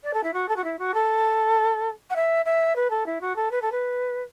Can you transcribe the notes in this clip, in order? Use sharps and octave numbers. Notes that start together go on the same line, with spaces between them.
D5
A4
E4
F#4
A4
F#4
E4
F#4
A4
F#5
E5
E5
B4
A4
E4
F#4
A4
B4
A4
B4